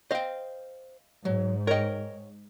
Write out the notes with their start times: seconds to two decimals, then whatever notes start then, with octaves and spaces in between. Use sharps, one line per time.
0.11 C5 D#5 F5 G5
1.25 G#2 F#3
1.67 A#4 C#5 D#5 G5